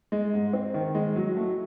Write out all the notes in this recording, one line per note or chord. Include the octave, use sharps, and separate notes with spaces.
G#3
G#2
C4
D#3
G#3
F#3
A3